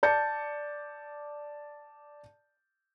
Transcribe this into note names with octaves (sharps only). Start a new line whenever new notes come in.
D5 A5 G6 C#7